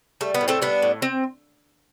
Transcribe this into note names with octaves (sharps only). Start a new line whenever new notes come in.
G3 A3
B3
A2
A3 C4
G3 B3 D4
A2
C4